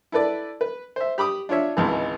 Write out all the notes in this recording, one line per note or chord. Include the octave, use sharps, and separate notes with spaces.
E4 A4 B4 D5
B4
C5 E5
G4 B5 D6 D#6
D4 F4 C#5 E5
G#1 C#2 E3